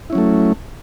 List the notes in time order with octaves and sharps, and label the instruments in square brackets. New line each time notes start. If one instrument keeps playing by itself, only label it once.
[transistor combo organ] E4
C#4
F#3
A3